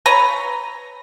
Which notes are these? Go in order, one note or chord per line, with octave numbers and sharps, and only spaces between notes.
B4 C#5 A#5